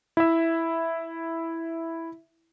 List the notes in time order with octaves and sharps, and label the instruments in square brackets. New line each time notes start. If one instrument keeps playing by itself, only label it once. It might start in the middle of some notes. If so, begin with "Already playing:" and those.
[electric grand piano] E4 E5